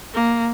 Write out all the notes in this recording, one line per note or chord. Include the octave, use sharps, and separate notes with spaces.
A#3